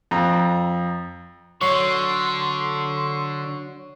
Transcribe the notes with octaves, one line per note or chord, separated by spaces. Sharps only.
F2 A#5
D3 F#3 C6 C#6 C7